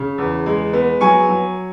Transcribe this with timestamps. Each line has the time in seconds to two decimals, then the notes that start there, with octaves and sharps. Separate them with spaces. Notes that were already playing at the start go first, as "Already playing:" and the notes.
Already playing: C#3
0.18 E2
0.46 G#3
0.73 B3
1.01 F#3 G#5 C#6
1.29 F#3